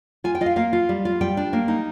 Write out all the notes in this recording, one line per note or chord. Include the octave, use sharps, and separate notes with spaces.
F4 G#5
G5
F4 D#5
F5
A#3 F5
F4
G3
F4
G3 G5
D4
A#3
D#4